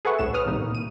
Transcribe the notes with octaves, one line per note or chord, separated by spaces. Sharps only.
G#4 A4 B4 E5 F#5 C#6
C2 A2 E7
B4 C#5 D#6 F6
A2 C3 D#3 G3 A#3 D#4
A#2
D#7